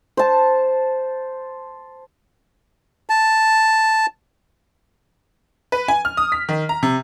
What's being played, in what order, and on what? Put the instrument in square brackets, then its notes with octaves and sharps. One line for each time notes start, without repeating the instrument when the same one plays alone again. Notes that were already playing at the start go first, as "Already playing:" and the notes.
[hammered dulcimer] C5 A5
[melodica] A5
[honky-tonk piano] B4
G#5
F6
D#6
B6
D#3
A#5
C3